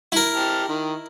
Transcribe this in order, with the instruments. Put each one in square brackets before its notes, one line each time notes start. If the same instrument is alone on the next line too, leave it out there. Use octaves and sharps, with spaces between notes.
[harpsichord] E4 A#4
[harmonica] G4 A5 F6
D#3